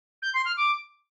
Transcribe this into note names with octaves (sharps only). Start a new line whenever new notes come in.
G6
C6
F6
D6